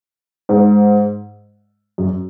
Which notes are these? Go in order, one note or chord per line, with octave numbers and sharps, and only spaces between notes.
G#2
F#2